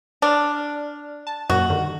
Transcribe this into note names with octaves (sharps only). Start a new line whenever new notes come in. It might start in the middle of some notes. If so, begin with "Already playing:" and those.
D4 D5 F6
A5
F#2 A#2 F#4
G2 D3 D#3